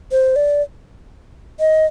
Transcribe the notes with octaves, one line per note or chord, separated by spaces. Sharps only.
C5
D5
D#5